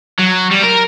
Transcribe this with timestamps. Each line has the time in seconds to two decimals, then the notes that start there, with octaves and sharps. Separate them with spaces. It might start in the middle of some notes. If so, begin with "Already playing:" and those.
0.19 F#3
0.51 G3
0.63 A#4